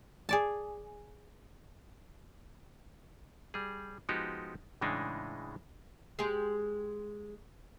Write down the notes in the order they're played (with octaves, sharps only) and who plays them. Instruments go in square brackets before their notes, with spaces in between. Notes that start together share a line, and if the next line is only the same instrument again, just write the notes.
[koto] G#4 D5 A5
[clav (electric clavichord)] G3 G#4
F3 G#3 B3 D#4 F#4 G4
A2 C#3 E3 G#3 D4 D#4
[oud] G#3 G4 G#4